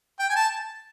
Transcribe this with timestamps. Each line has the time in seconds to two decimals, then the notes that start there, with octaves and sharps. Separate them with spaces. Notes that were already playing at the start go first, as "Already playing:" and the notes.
0.19 G5
0.30 G#5
0.36 A5